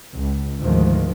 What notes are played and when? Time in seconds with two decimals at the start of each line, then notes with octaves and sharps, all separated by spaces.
0.13 C#2
0.60 D2 G#2 D#3 F3